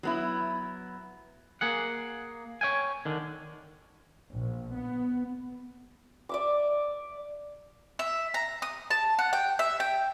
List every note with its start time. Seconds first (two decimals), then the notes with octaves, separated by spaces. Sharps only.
0.03 F#3 B3 E4
1.61 A#3 G#4 F#5
2.61 C#5 E5 G5 G#5
3.05 D3 D#3
4.34 A#1
4.77 B3
6.29 D5 E5 D6
7.99 E5
8.34 A#5
8.62 D#6
8.91 A5
9.19 F#5
9.33 G5
9.59 E5
9.80 G5